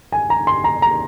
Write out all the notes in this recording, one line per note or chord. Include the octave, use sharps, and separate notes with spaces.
G#5
A#5
C6
A#5
A#5